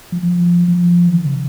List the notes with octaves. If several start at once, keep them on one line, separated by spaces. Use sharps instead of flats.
F3
F3
F3
E3
D#3
C#3